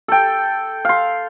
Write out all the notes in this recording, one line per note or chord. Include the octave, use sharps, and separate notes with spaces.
A4 G5
F5 C6